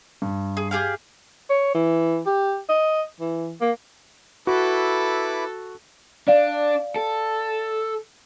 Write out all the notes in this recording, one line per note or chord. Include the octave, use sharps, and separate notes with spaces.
G2
G#4
G4 G#4 F5
C#5
E3
G4
D#5
E3
A#3
E4 F#4 A4 B4 D6
D4 D5 F5
A4